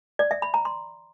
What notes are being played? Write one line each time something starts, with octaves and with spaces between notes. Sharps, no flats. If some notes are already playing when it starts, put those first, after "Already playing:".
D5
E5
B5
A#5
C6